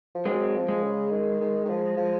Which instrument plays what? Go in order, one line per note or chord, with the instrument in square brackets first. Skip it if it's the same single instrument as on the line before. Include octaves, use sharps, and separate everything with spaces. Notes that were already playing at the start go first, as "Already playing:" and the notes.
[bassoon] F3
[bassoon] F#3 [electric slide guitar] G#3 C4
[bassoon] F3
[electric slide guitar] G#3
[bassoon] C#3
D#3
D#3
D#3
F3
F3